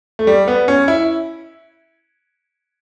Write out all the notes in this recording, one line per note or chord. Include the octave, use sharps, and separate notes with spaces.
A3
G3
B3
C#4
E4